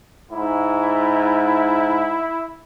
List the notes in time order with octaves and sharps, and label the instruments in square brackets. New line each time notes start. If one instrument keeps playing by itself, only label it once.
[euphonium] G#2 [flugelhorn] E4